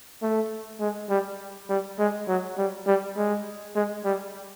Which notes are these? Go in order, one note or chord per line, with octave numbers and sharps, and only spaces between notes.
A3
G#3
G3
G3
G#3
F#3
G3
G3
G#3
G#3
G3